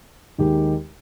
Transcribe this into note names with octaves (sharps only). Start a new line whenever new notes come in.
D#2 D#3 G#3 D#4 G4